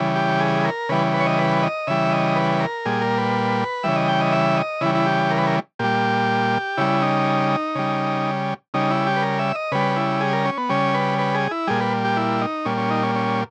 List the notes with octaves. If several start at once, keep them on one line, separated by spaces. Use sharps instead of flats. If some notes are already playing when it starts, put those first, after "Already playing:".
Already playing: C#3 E3 G3
G4
G#4
A#4
C#3 E3 G3 B4
B4
C#5
D#5
B4
D#5
C#3 E3 G3 E5
D#5
B4
A#4
A#2 G3 G#4
A#4
B4
C#3 E3 G3 E5
D#5
G5
D#5
E5
D#5
C#3 E3 G3 E4
E4
G4
A#4
B4
A#4
A#2 G3 G4
C#3 G3 E4
D#4
C#3 G3
C#3 G3 D#4
E4
G4
B4
A#4
E5
D#5
C#3 G3 B4
E4
G#4
A#4
C#4
B3
C#3 G3 C#4
B4
B4
G#4
E4
A#2 G3 G#4
B4
G4
E4
D#4
A#2 G3 C#4
C#4
D#4
C#4
C#4